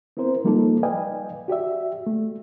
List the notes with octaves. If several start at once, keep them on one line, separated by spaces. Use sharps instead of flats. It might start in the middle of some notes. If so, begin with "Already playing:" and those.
B3 C4 E4 A#4 C5
F3 G3 A#3 D#4 F4 A4
B4 D5 D#5 F5 G5 G#5
F#4 G4 D5 E5
A3